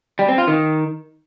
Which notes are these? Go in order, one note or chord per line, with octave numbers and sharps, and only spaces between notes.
G3
C4
F4
D#3